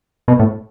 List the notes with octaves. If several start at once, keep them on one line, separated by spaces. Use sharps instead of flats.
B2
A2